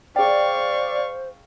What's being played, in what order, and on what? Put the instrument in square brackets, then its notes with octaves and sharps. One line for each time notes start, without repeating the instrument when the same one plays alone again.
[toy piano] G#4 G5 [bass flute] C5 [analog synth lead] D5 [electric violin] F5 C#6